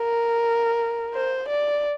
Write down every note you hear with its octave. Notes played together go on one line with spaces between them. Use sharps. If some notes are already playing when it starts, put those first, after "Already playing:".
Already playing: A#4
C5
D5